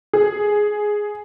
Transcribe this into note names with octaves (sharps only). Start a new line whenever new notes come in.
G#4